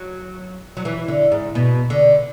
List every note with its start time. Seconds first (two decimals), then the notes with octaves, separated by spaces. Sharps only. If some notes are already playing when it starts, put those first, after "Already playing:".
Already playing: F#3
0.77 F#3
0.85 E3
1.08 D3
1.32 G#2
1.55 B2
1.90 D3